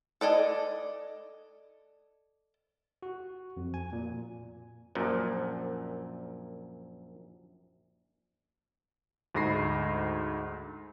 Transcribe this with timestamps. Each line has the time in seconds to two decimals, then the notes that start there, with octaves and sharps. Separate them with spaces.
0.21 A4 D5 D#5 G#5
3.03 F#4
3.57 F2
3.74 G#5
3.93 A#2
4.95 A#1 F#2 A#2
9.35 D2 G#2 B5 A#6 C7